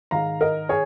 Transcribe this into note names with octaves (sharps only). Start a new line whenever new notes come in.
G#2 D#3 F5 A#5
A#4 D#5
G#4 C#5